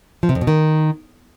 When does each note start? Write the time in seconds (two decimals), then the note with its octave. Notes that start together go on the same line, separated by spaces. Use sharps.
0.23 F3
0.29 C3
0.35 F2
0.41 B2
0.47 D#3